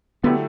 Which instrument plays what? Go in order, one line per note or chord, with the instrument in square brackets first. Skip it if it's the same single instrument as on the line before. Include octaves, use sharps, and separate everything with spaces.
[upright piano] D3 F#3 A3 E4 G4 [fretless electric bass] B3